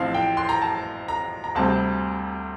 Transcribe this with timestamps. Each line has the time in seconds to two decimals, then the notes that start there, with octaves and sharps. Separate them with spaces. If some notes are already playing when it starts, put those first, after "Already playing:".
Already playing: A1 A2 F3 C4 F5
0.14 G5
0.37 C6
0.49 A#5
0.62 A5
1.08 A#5
1.44 A#5
1.55 D2 C3 G3 C4 A5